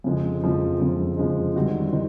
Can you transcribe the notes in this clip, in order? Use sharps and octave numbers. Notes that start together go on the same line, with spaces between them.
F2 C#3 F3 G#3
F2 C#3 F3 G#3
F2 C#3 F3 G#3
F2 C#3 F3 G#3
D#3 G3 C4 D#4 F#4
D#3 C4 D#4